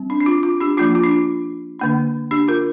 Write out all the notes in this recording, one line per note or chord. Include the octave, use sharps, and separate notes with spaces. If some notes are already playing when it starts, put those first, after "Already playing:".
Already playing: G3 C4
D4
D4
F4
F4
D4 G4
F3 A#3 D4 F4
F4
D4
F4
D3 A#3 D4
D4 G4
F4 A#4